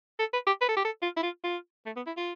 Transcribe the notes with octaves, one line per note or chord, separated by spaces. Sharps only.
A4
B4
G4
B4
A4
G4
A4
F4
E4
F4
F4
A3
B3
E4
F4